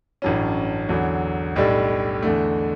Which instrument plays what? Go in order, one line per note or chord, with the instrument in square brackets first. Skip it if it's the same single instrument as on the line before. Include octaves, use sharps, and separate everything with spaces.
[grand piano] A1 G2 F#3 C#4
E2 D3 F#3
B1 A2 G3 D4
E2 D3 A3